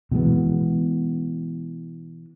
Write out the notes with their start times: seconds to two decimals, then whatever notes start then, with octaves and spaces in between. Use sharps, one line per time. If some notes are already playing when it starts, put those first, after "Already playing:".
0.11 B2 E3 G#3 B3